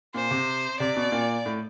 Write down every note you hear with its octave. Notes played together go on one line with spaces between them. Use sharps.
A#2 C5
C3
C3 D5
B2
A#2
A2